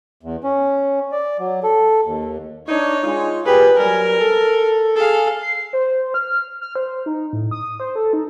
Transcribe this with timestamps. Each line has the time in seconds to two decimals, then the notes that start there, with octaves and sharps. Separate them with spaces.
0.23 E2
0.44 C#4
1.12 D5
1.39 F#3
1.63 A4
2.06 D#2
2.67 D4 D#4 C#5
3.04 G#3 D#4 F4
3.46 A#2 G4 G#4 B4
3.78 F#3 G3 A#4 G#5
4.19 A4
4.96 G#4 A4 F5
5.42 C7
5.73 C5
6.14 F6
6.61 F6
6.76 C5
7.06 D#4
7.33 A2
7.51 D#6
7.80 C5
7.96 A4
8.13 D#4